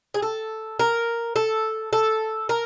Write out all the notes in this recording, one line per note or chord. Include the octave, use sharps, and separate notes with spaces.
G#4
A4
A#4
A4
A4
A#4